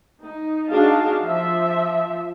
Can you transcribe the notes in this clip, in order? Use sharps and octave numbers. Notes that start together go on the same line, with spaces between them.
D#4
D4 D#4 F#4 G#4 F5 A5
F3 E5